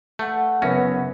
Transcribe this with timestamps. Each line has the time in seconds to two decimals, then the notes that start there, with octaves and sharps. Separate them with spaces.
0.19 A3 B4 F#5
0.62 F#1 B3 C#4 E5 A#6